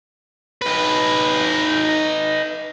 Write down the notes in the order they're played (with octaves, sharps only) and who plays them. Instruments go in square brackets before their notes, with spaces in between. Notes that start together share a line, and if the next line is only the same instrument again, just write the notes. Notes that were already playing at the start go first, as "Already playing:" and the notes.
[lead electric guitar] D#4 B4